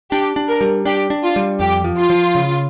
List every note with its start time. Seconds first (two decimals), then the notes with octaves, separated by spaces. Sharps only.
0.12 D4 G4
0.36 D4
0.48 A#4
0.61 G3
0.85 D4 G4
1.10 D4
1.23 F4
1.36 G3
1.60 F2 G4
1.84 F3
1.98 F4
2.10 F3
2.35 C#3